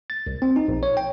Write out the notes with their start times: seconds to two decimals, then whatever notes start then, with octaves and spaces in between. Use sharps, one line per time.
0.10 A6
0.27 C2
0.42 C4
0.56 D#4
0.68 A#1
0.83 C#5
0.97 G5